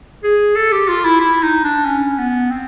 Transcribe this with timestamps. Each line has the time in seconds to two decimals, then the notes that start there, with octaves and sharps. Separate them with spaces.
0.23 G#4
0.56 A4
0.72 G4
0.88 F4
1.05 E4
1.21 E4
1.43 D#4
1.64 D4
1.85 C#4
2.18 B3
2.50 C4